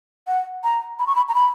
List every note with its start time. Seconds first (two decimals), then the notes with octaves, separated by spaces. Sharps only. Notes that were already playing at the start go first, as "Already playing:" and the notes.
0.27 F#5
0.64 A#5
0.99 B5
1.07 C#6
1.16 B5
1.29 A#5
1.35 B5